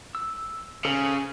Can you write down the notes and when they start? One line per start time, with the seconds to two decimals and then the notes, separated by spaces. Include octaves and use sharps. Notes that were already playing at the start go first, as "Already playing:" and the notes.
0.15 E6
0.85 C#3 A4 C5 G#5